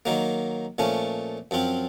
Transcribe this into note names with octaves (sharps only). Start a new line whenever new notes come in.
D#3 F#3 A#3
A#2 F3 A3 C#4
F#2 F3 C4 F4